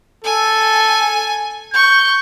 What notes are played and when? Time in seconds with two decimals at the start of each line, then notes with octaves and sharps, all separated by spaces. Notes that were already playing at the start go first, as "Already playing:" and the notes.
0.24 A4 G#5
1.74 C#6 G6